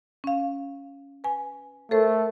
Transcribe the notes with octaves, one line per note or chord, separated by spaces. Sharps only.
C#4 F5
B4 G#5
A3 A4 A#4 C5